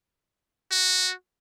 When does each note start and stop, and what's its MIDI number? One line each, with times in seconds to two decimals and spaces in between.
0.71 1.12 66